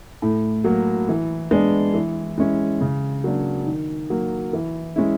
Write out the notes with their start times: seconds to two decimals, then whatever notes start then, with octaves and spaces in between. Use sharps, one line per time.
0.22 A2
0.64 F#3 A#3
1.09 E3
1.51 G#3 B3 D4
1.94 E3
2.38 G#3 C#4 E4
2.81 C#3
3.24 F#3 A#3 D4
3.67 D#3
4.10 F#3 A#3
4.53 E3
4.96 G#3 C#4 E4